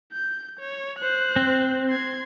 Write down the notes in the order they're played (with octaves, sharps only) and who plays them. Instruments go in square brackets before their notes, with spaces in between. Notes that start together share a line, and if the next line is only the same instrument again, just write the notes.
[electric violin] G6
C#5
C5 F#6
[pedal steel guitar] C4
[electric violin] C6 G#6